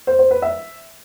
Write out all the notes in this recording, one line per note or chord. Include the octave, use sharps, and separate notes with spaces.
C5
C5
B4
E5